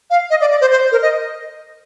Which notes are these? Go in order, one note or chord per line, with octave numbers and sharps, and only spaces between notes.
F5
D#5
D5
D5
C5
C5
A#4
D#5